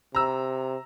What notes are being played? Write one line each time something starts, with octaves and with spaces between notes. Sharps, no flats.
C3 A#5 E6